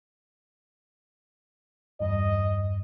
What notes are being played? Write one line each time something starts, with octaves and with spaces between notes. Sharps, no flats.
E2 G2 D#5